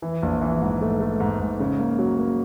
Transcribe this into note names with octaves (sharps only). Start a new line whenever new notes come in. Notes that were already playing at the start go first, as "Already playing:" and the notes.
E3
A#1
E3
G#2
A3
A3
G#2
G#2
C#3
A#3
F#3
A#3